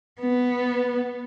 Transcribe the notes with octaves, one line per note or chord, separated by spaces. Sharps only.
B3